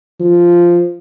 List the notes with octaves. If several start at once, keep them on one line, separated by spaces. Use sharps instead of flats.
F3